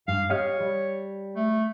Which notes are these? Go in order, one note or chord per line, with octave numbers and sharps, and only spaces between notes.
G2 F5
G4 C#5 D#5 F5
G3
A3